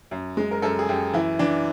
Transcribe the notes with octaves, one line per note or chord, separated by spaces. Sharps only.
F#2
G#3
A#4
F#2 A4
G#4
F#2 G4
E3 E4
E3 D4